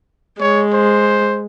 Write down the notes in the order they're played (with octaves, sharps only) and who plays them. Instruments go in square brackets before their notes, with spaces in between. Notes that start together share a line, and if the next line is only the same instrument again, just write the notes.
[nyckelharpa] G#3 [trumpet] C#5
[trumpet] C5